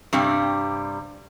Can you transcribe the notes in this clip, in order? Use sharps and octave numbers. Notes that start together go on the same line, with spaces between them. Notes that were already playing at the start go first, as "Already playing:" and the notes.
G2 C3 G3